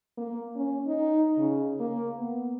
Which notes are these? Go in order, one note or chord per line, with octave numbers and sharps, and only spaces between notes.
A#3
C#4
D#4
C#3
A#3
B3